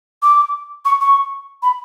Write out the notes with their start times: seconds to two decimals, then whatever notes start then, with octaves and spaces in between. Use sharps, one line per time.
0.22 D6
0.85 C#6
1.01 C#6
1.62 B5